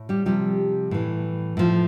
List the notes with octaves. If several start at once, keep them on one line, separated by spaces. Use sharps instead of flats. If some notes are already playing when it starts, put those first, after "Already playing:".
Already playing: A2
G3 G4
C3 F3 G3 G4
A2 E3
A2 F3